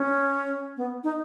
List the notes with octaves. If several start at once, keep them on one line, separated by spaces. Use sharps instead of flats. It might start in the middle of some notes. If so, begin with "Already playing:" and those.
Already playing: C#4
B3
D#4